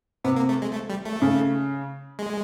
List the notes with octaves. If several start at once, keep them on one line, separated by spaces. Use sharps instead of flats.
C3 B3
A#3
A3
G#3
A3
G3
A3
C#3
G#3